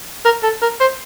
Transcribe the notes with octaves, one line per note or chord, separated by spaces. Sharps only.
A#4
A4
A#4
C5